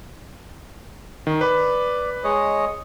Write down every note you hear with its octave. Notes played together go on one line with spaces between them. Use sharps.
D#3
B4 D5 B5
G#3 C#5 D#5